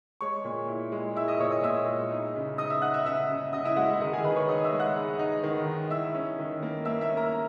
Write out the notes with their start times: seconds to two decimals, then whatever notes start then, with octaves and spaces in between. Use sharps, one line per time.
0.21 G#3 C#5 C#6
0.44 A#2
0.68 E4
0.92 G#3
1.16 E4 E5 E6
1.28 D#5 D#6
1.39 A#2 C#5 C#6
1.51 D#5 D#6
1.63 A#2 E5 E6
1.88 G#3
2.11 D#4
2.35 C#3
2.58 D#4 D#5 D#6
2.70 E5 E6
2.82 D#4 F#5 F#6
2.94 E5 E6
3.06 C#3 E5 E6
3.30 C#3
3.53 C#3 D#5 D#6
3.65 E4 E5
3.77 G#3 F#4 F#5
3.89 E4 E5
4.00 D#3 D#4 D#5
4.13 G#4 G#5
4.24 D#3 B4 B5
4.36 C#5 C#6
4.48 D#4 D#5 D#6
4.64 E5 E6
4.72 G#3
4.80 F#5 F#6
4.96 D#4
5.19 D#4
5.43 D#3
5.66 D#4
5.90 E4 E5 E6
6.14 C#4
6.39 D#3
6.62 A#3
6.85 A#3 E5 E6
7.01 E5 E6
7.09 C#4
7.17 A#4 A#5